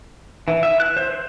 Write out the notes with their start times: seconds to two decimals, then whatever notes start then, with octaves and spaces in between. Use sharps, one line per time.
0.48 E3
0.63 E5
0.80 F#6
0.97 C5
1.10 C5